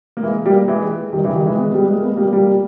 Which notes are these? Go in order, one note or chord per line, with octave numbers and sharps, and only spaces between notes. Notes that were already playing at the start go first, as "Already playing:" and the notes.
A#3
E3 G#3
G3 A#3
E3 G#3
D#3 G3
C#3 E3
D#3 G3
E3 G#3
G#3 B3
G3
G#3
A#3
G#3 B3
G3 A#3
G3 A#3